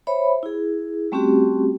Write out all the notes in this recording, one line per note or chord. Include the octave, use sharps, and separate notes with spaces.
C5 C#5 E5 B5
E4 G#4
G3 A3 C4 C#4 F#4 G4